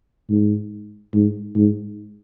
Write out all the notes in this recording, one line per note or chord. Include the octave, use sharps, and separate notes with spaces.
G#2
G#2
G#2